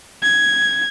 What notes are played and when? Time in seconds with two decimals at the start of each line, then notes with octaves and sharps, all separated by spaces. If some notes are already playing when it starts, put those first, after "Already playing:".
0.22 G#6